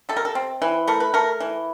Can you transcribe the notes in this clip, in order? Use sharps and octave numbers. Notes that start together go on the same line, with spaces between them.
C3 A4
A#4
A4
C4
E3
A3 A#4
B4
A3 A#4
E3